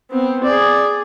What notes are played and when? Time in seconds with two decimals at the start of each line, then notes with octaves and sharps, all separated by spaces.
0.11 B3 C4
0.44 G#4 D5